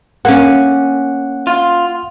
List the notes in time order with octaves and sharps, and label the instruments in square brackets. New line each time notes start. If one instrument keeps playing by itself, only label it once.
[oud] A#3 C#4 [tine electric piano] F#5
[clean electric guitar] F4